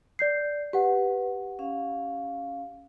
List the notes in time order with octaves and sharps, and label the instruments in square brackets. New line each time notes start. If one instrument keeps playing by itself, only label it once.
[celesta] D5 G6 C7
[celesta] G4 F#5 [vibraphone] B4
[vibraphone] C#4 F5